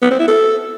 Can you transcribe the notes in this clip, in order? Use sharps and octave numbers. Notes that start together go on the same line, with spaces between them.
B3
C4
E4
A4